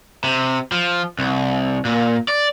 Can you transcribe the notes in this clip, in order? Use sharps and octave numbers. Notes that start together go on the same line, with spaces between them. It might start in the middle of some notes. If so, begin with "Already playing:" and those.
C3
F3
C2
A#2
D5